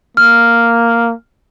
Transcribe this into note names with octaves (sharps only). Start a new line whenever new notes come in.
A#3 F6